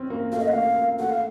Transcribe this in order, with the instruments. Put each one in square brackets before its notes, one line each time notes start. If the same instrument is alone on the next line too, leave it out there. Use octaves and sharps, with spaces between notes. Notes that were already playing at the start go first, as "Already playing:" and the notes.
Already playing: [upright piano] C4 C#4
A#3
[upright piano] A3 [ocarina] F5
[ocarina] D#5
F#5
[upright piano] A3 [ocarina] F5
[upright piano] A#3
[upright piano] A3 [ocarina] F#5
[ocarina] F5